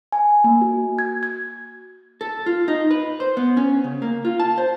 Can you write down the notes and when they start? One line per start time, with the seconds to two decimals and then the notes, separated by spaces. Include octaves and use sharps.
0.12 G#5
0.44 A#3
0.61 F#4
0.99 G#6
1.23 G#6
2.21 A4
2.46 F4
2.68 D#4
2.91 B4
3.20 C5
3.37 B3
3.57 C#4
3.84 C#3
4.02 A#3
4.25 F4
4.40 A5
4.58 C5